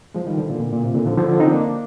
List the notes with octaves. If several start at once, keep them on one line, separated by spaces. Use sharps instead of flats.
F3 G#3
D#3 G3
D3 F3
A#2 D3
A#2
A#2
C3
A#2 D3
D3 F3
D3 F3
D3 F3
C4 D#4
A#3 D4